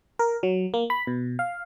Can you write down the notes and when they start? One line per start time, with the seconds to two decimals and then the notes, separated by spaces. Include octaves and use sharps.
0.19 A#4
0.43 F#3
0.74 A#3
0.90 B5
1.07 B2
1.39 F5